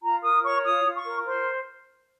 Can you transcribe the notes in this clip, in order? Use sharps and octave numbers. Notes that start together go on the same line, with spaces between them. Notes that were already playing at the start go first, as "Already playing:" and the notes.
F4 A#5
A#4 D#6
C#5 C#6
F4 D#6
F4
C#6
A#4
C5 C6